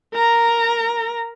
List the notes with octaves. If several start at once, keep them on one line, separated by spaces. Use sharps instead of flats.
A#4 A#5